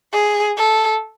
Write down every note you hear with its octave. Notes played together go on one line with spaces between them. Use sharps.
G#4
A4